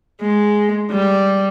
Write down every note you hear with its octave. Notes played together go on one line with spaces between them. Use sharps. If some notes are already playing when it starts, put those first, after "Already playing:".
G#3
G3